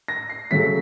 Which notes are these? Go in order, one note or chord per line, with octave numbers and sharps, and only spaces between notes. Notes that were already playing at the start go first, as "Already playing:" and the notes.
A#6
C7
C#3 F#3 A3 B6